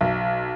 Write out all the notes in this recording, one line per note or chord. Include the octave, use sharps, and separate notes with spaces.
B1